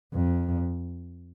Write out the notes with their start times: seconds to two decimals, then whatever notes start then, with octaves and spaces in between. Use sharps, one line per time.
0.13 F2